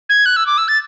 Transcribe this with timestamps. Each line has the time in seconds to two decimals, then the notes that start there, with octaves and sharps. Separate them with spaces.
0.09 G#6
0.26 F#6
0.36 E6
0.47 D6
0.58 E6
0.68 A6